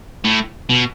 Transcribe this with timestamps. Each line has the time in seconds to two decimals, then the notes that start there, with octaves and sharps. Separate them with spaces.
0.24 A2
0.69 B2